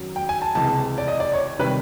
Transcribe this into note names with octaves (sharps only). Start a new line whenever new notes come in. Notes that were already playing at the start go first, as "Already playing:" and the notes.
Already playing: F#2 D#3 F#3
G5
G#5
A5
C#2 C3 E3 A5
D5
D#5
D5
C#5
C3 D#3 G3 B4